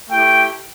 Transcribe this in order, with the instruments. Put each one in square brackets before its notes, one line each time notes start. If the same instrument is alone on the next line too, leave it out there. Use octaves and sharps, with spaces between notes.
[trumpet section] A3 E4 G4 G5